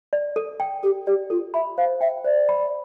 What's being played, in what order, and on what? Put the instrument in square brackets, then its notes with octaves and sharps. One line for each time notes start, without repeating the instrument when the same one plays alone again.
[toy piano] D5
A4
G5
[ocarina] G4 [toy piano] A4
[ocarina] G4 [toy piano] D5
[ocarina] F4 [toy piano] A4
[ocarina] E5 [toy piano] B5
[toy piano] C5 [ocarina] F5
[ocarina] E5 [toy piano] G5
[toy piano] C5 [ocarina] D5
[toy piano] B5